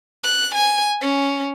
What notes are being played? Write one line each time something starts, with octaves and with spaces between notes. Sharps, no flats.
F#6
G#5
C#4